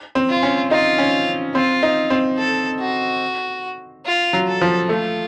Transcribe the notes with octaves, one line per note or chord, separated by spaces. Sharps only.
C4
F4
C#4
D#4 F4
C#4
C4 F4
D#4
C4
A4
F#4
F4
F#3
A4
F3
A3 F4